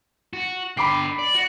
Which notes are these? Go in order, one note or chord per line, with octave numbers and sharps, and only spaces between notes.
F#4
D3 G5 B5 D6 C7
D5
F#4